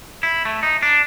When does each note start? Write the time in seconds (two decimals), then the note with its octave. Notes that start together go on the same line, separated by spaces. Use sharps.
0.23 E4
0.45 A3
0.63 D#4
0.83 D4